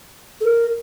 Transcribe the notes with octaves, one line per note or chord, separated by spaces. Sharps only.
A4
A#4